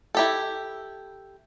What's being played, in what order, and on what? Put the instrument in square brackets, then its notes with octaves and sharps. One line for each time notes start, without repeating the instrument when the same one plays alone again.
[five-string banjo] E4 G4 A4